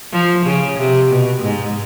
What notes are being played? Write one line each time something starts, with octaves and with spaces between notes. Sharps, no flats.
F3
C#3
C3
B2
G#2